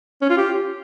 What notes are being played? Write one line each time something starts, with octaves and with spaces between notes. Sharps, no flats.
C#4
F4
G4